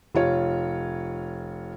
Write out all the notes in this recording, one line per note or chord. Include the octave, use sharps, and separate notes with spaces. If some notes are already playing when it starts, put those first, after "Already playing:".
F1 F4 C#5